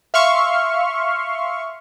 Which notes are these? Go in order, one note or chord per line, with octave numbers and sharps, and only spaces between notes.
E5 F5 C6 C#6 F6